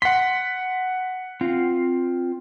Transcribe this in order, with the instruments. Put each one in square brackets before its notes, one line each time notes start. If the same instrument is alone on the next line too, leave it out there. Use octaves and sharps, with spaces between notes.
[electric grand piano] F#5 B6 [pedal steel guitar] C6
[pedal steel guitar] C4 F4